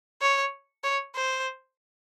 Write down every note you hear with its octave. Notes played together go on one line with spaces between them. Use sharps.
C#5
C#5
C5